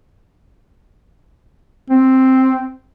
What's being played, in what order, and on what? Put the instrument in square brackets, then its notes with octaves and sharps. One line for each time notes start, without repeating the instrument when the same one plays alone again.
[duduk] C4